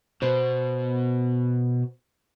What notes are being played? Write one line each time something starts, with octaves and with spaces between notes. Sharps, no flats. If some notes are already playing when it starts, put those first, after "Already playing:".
B2 C5